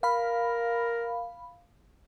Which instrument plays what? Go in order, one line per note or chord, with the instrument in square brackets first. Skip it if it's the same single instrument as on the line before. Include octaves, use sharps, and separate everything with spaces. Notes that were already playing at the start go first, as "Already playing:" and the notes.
[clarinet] A#4 [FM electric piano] F5 B5